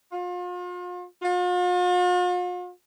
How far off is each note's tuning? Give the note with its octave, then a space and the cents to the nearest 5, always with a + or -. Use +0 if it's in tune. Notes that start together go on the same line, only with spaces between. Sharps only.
F4 +40
F4 +45